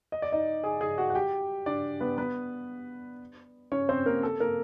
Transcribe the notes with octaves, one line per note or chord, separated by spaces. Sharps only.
D#5
D5
D#4 D#5
G#4 G#5
G#4 G#5
F#4 F#5
F#5
G4 G5
D4 D5
B3 B4
B3 B4
C#4 C#5
C4 C5
A#3 A#4
A4
A#3 A#4